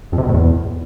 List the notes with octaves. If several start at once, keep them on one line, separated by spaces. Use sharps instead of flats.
F2
C3
B2
A2
E2